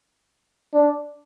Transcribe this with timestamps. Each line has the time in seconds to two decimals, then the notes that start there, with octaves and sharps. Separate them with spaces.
0.74 D4